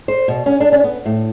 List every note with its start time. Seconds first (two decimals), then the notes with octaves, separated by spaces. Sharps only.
0.08 C5
0.28 B2
0.46 C#4
0.60 D4
0.72 C#4
0.84 B3
1.05 A2